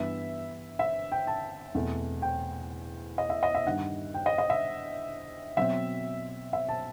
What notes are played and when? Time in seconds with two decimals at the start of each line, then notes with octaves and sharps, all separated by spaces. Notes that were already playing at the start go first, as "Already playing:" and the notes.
Already playing: G2 E3 G3 B3 E5
0.79 E5
1.12 G5
1.27 A5
1.75 E2 B2 A3 C4
2.22 G5
3.18 D#5
3.30 E5
3.43 D#5
3.55 E5
3.66 G2 D#3 G3 F#5
4.14 G5
4.26 D#5
4.38 D#5
4.50 E5
5.57 B2 F#3 C4 E5
6.53 E5
6.69 A5